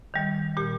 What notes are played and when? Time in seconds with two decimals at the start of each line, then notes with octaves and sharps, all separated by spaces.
0.14 D#3 G3
0.57 A#2 G4